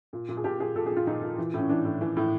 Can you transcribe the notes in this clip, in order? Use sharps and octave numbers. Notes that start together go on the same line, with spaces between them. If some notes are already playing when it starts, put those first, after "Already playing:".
A#2
A#2
G#4
A#2 G4
A#2 G#4
A#2 A4
G#4
A#2
F4
A#2 D#4
A#2
E3
A2 C#4
E3 D4
A2
E3
A2